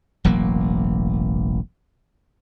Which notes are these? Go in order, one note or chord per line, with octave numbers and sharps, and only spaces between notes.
E1 A1 F#3 A#3